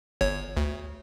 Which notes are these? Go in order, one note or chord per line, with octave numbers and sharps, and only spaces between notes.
G1 C#5
D2